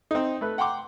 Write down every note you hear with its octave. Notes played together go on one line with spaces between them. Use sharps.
C4 D#4
A3 B4
F#5 G5 A#5 C6 D6